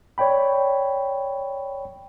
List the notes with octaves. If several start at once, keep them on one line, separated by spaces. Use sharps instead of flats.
C#5 D5 G5 B5